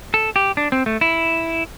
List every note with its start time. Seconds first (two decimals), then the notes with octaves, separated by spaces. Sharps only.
0.14 A4
0.36 G4
0.57 D4
0.72 C4
0.86 A3
1.01 E4